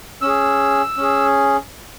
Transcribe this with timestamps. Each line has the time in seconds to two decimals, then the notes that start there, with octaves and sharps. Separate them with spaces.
0.22 C#4 G#4 E6
0.97 C#4 G#4